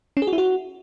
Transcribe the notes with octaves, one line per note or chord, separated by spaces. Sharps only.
C#4
G#4
F#4
E4
F#4